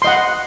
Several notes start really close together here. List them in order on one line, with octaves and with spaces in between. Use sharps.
C6 D#5 F#5